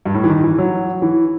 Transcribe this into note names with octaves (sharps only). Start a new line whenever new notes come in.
G2
A2
E3
D#3
E3
F#3
E3